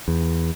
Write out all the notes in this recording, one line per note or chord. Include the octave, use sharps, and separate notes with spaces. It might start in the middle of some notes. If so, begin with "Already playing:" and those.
E2